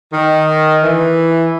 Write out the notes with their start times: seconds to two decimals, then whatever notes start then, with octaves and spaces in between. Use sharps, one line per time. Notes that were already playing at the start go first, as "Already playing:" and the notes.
0.12 D#3
0.82 E3